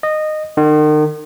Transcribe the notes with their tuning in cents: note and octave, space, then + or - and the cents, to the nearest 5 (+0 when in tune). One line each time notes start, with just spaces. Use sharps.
D#5 -15
D#3 -40